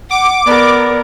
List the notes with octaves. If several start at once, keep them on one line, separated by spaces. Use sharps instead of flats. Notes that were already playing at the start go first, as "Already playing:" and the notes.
F#5 D6
B3 A#4 D5